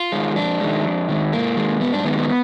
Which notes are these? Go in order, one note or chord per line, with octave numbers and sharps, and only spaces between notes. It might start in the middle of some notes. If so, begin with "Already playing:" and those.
Already playing: F4
D#3 G#3
F2 D4
D#3 G#3
F2
D#3 G#3
G#2 A#3
D#3 G#3
G#2 B3
D4
D#3 G#3 B3
B3